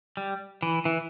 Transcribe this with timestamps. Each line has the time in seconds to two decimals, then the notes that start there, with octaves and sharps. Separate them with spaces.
0.17 G3
0.62 E3
0.85 E3